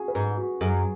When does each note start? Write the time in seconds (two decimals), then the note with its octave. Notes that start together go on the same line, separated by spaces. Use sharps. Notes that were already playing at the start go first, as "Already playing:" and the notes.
Already playing: F#4 G#4
0.08 B4
0.15 G#2 G#4
0.37 F#4
0.61 F#2 G#4